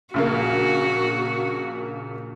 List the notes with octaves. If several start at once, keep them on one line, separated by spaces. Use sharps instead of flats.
A#1 C#3 A#3 F#4